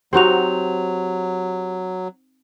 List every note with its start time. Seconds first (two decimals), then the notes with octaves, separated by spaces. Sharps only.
0.13 F#3 C4 D#4 F#4 G4 F7